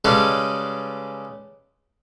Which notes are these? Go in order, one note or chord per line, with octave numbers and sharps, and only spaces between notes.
C#3 G3 G#3 C#4 A4 B4